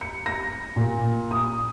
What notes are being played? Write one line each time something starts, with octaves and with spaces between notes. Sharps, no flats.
C#7
A#6
A#2
D#6